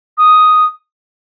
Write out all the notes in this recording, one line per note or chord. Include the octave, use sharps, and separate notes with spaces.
D#6